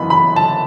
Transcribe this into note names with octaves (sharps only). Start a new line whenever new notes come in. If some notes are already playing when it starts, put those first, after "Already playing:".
Already playing: F#2 E3 B3 D#4 B5
B5
A5